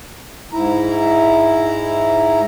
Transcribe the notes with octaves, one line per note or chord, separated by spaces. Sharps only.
G#2 E4 A#5